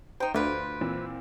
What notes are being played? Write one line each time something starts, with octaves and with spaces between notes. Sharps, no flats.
D#4 C5 G5
D2 F4 B4 D5
A#2 E3 C4